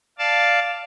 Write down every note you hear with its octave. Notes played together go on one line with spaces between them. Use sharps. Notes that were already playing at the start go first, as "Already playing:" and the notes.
D5 F5 A5